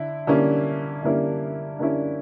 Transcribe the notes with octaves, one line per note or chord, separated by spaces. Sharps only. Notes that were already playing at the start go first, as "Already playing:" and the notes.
Already playing: D3 E4
D3 G3 A#3 C#4 E4
D3 G3 A#3 C#4 E4
D3 G3 A#3 C#4 E4